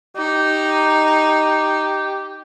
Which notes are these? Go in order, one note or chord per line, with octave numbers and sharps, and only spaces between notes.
D#4 G4